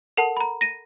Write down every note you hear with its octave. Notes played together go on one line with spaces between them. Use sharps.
A4 A#4 F#5 A5
A#5 B5
A#6 D#7